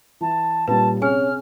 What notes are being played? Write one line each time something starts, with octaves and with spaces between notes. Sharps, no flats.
E3 A5
A#2 G3 C#4 B4 A5
C3 C#4 G#4 G#5 F6